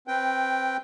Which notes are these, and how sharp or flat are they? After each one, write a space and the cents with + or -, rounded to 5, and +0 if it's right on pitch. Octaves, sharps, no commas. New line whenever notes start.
C4 +15 B4 +0 G5 +0